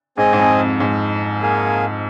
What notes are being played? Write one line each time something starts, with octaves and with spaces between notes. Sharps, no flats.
G#2 C4 G#4 D#5 G#5
G#2
F2
F2
G#2
A#3 G#4 F5 G#5